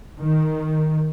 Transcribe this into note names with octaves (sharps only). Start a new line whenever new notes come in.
D#3